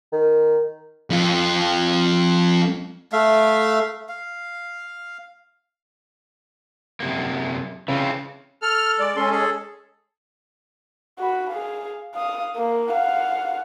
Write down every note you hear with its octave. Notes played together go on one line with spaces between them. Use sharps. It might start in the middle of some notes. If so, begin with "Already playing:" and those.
D#3
F2 F4
A3 E5 F5
F5
F#2 C3 A#3
C#3 E3 C4 F4
A4 F6
G#3 D5
G#3 C#4 A4 C6
G#4 A4
F#4 B5
G#4 F5
F5 D#6
A#3
F5 F#5